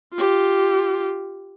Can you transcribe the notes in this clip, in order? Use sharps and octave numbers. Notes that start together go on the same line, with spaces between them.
F4 G4